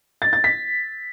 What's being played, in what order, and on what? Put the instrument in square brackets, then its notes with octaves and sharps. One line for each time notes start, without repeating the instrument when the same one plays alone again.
[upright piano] A6
A6
B6